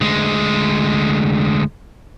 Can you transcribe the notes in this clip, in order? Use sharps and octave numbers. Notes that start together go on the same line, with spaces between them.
D2 G#3